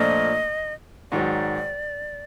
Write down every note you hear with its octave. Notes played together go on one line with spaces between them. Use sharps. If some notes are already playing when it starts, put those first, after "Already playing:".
Already playing: A#2 F3 A3 D4 D#5
G#2 D#3 F#3 D5